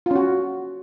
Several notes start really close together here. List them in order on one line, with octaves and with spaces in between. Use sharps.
F4 C#4 F#4